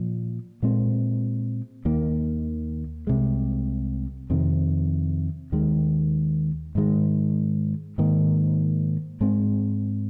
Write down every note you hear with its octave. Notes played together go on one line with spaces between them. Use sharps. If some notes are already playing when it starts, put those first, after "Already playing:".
Already playing: A#2 F3
A#2 G#3 C4
D#2 D#3 A#3
C2 C3 G#3
F2 C3 D#3 C4
D#2 D#3 G#3
G#2 D#3 G#3
G#2 D#3 A#3
G#2 G#3 C4